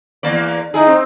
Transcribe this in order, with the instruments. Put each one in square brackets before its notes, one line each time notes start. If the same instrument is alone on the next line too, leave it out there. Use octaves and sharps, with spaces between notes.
[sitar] E2 A#3 D5
[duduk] D#4 [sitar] E4 G#4
[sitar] C4